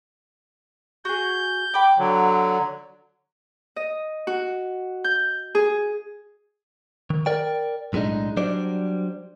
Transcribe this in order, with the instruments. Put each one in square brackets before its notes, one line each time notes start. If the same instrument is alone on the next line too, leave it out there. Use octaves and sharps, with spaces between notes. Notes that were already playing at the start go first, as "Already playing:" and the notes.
[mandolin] F#4 G#4 [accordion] G6
[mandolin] G5 B5 D6
[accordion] D3 F#3
[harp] D#5
F#4
G6
G#4
[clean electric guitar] D#3
A#4 D5 G5
B1 A2 G#3 D4 D#4
F#3 G3 D4 C5 D5